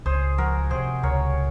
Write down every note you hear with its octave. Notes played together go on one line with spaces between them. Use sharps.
C#2 G#4 C5
F3 F#4 A#4
C3 G#4 C5
C#2 A#4 C#5